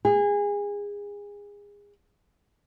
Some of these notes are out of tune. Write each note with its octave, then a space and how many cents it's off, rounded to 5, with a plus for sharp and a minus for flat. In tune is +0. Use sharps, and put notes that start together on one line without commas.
G#4 -25